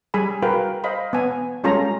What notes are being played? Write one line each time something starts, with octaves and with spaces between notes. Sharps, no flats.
G3 G#4 G#5 B5
F#4 A#4 B4 F5 G5
C5 D#5 F5 B5
B3 G#5
G3 G#3 C#4 F4 A4 A#5